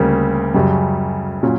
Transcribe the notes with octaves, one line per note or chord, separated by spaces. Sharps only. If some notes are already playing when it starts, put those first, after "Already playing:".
Already playing: D2 C#3 G3 A#3
F#2 C#3 G3
A#2 F#3 C#4